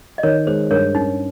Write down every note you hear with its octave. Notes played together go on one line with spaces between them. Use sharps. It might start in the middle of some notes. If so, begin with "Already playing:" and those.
D#5
D#3 A#4 C#5
G#3 C5
G2 A#4 C#5
C#4 D#4